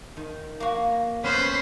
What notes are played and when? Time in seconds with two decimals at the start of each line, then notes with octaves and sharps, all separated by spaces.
0.17 D#3
0.60 A#3 F#4
1.24 B3 C#4 C5